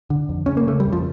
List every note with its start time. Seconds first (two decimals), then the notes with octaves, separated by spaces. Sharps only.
0.10 D3
0.29 F2
0.46 C#3 C#4
0.57 A#3
0.67 C#3 A3
0.80 G3
0.87 F2
0.93 F3